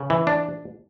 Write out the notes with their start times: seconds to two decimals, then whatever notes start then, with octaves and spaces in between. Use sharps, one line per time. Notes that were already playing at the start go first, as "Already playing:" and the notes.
Already playing: C#3
0.10 E3
0.27 D4